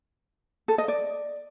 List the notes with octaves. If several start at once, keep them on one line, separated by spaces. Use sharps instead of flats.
A4
D#5
D5